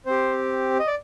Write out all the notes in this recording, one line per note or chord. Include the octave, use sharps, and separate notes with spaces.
C4 G4 C5
D#5
D5